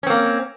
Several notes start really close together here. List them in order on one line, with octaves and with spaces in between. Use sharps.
C#4 C4 A#3